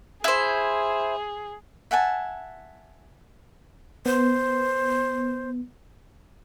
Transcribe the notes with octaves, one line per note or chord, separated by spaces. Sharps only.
E4 G#4 C5
E5 F#5 G#5 A5
B3 C5